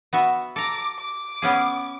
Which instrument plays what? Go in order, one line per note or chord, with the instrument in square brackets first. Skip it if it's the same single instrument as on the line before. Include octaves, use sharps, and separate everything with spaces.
[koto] B3 F#4 E5
[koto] A4 A#5 [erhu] D6
[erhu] D6
[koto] B3 C#4 G#4